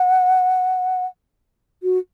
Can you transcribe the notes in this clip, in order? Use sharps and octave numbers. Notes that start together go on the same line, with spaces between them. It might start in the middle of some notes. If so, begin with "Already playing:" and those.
Already playing: F#5
F#4